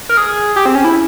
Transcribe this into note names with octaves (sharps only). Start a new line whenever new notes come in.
A#4
G#4
G4
C4
C#4
E4